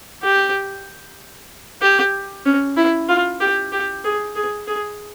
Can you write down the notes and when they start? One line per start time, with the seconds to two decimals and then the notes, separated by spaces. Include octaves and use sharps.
0.23 G4
1.82 G4
2.45 C#4
2.77 E4
3.09 F4
3.41 G4
3.72 G4
4.04 G#4
4.36 G#4
4.68 G#4